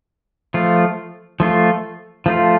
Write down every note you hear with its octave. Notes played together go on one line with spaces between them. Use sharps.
F3 A3 F4
F3 A3 F4
F3 A3 F4